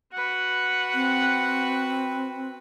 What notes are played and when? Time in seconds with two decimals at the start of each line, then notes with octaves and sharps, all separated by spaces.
0.13 F#4 B4 F#5
0.94 C4